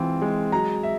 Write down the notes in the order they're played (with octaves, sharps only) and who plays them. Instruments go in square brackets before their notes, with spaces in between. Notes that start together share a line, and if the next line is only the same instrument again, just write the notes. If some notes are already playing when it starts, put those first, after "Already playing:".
Already playing: [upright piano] E3 G#3 C4 F4
G#3
F#3 A#5
E5